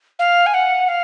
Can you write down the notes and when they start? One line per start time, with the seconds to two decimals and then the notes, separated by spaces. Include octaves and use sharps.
0.19 F5
0.46 G#5
0.54 F#5
0.88 F5